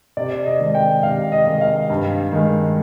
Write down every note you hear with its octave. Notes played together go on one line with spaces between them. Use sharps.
C3 D5
D#5
D#3 G#3
G5
C3 F5
D#5
D#3 G#3
F5
G2
D#3 G#3